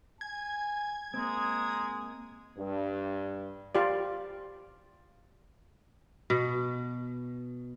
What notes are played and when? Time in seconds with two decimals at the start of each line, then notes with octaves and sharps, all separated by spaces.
0.21 G#5 G#6
1.14 G#3 A#3 C4 A#5 D#6
2.57 G2
3.75 F4 G4 D5
6.30 B2